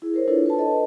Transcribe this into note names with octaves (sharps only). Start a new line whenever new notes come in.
E4 G#4
A#4 C5 C#5
D4 E4 F4 A4 B4 C#5
B4 A5
A4 D#5